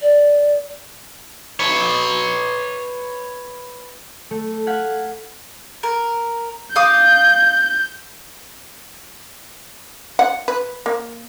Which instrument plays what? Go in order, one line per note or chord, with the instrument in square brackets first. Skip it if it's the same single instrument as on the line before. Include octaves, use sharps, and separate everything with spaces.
[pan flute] D5
[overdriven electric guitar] B4 C#5
[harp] A3
F5 F#5 G#6 B6
[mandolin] A#4
[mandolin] F5 D6 D#6 [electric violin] G6
[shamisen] F#5
B4
A#3